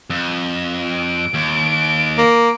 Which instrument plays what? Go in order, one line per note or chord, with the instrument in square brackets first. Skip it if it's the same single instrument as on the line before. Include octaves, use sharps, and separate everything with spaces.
[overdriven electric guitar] F2
[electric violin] D7
[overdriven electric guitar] D#2
[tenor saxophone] A#3